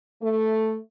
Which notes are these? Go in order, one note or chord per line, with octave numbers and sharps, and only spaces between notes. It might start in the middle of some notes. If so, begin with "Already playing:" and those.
A3